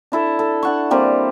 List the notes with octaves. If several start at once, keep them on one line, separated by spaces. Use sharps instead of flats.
D4 E4 A4
A4
D4 F#5 C#6
G3 A#3 C4